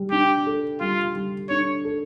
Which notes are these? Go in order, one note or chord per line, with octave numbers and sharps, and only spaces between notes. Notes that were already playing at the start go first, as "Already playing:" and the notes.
Already playing: G3
D4 G4
A4
G3 F4
G3
D4 C#5
A4